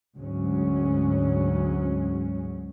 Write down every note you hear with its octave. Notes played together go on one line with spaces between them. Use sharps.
D2 G#2 F#3 G#3 C#4